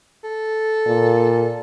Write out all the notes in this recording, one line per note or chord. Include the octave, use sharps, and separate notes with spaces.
A4
A#2